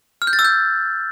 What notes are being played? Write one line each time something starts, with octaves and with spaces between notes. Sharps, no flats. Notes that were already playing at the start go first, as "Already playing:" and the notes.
F6
G6
A6
E6
G6